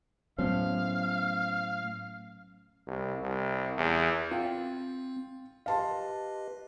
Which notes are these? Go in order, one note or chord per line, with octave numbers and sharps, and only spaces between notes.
A2 F#3 A3 B3 C#4 C5 F5
C2
C2
E2
C4 F4 G5
G4 B4 D#5 F5 A5 C6